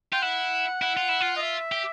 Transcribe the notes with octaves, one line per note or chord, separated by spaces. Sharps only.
F4 G5
E4 F#5
E4 F#5
F4
E4
F4
D#5
E5
G4